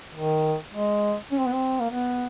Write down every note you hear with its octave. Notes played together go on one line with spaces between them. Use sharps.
D#3
G#3
C#4
C4
B3
C4
A#3
B3